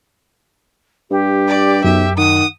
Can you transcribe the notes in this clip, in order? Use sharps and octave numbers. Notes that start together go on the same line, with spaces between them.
G2 G4
D5
B1 F#2 E5
D#3 F#5 D#6